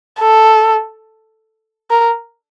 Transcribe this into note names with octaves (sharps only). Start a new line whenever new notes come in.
A4
A#4